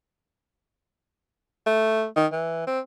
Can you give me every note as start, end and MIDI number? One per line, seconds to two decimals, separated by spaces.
1.66 2.05 57
2.16 2.26 51
2.32 2.63 52
2.67 2.79 60